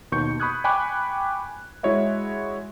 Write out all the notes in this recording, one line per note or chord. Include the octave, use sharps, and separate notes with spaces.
D#2 B2 C#6 G6 C#7
B5 C#6 D#6 F#6 G#6
G5 G#5 B5 C#6 D6 F#6
G#3 E4 F#4 C#5 D#5 E5